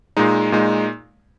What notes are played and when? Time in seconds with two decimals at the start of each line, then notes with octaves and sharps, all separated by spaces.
0.17 A#2 G#3 D#4
0.52 A#2 G#3 D#4